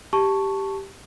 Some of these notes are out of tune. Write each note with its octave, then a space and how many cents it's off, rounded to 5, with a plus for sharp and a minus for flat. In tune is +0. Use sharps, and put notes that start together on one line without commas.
G4 +0 A5 +0 C#6 +0